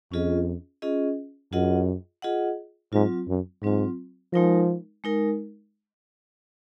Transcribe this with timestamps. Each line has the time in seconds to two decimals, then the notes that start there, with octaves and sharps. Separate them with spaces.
0.12 F2 C#4 F4 G#4 D#5
0.82 C#4 F4 G#4 D#5
1.52 F#2 F4 G#4 D#5 F#5
2.22 F4 G#4 D#5 F#5
2.93 G#2 F#3 C4 F4
3.28 F#2
3.63 G#2 F#3 C4 F4
4.33 F3 G#3 D#4 A#4
5.04 G#3 D#4 A#4